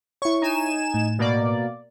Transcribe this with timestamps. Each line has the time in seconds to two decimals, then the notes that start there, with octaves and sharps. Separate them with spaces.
0.22 E4 C#5 C#6
0.41 D#4 G#5 E7
0.94 A2
1.19 B2 A#3 D5